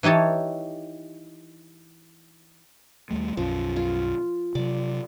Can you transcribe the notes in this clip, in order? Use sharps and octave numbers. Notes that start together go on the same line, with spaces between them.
E3 D#4 G4 C#5 A5
D#2 G3 A3
B1 F#2 F3 C#4
F4
C3 F#3 D5